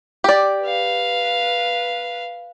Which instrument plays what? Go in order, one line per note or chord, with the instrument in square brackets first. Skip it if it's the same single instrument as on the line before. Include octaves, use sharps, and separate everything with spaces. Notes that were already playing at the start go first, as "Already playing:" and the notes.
[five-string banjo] G4 D5
[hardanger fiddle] B4 F5